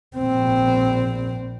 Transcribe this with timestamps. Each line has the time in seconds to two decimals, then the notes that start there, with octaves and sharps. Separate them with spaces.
0.17 A#1 C4